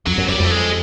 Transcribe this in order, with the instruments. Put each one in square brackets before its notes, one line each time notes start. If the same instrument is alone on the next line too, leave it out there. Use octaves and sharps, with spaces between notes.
[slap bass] F2 [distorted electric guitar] F#3
[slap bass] F#2
[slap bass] F#2 [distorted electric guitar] G3
[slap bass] F2 [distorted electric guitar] A3
[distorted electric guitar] G#3